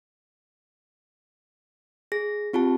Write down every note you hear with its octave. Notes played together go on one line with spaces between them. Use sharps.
G#4 A#6
C4 F4 G4 A5